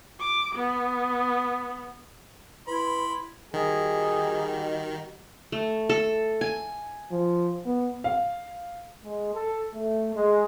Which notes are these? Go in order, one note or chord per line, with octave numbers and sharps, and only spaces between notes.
D6
B3
E4 B4 B5 C6
D#3 G3 D#4 F#4 G#4
A3
A4
G#5
F3
B3
F5
G#3
A4
A3
G#3